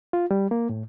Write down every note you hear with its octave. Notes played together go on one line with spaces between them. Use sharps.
F4
G3
A#3
A2